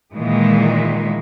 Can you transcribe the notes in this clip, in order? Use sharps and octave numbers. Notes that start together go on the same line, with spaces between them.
A#2 D#3 E3 G#3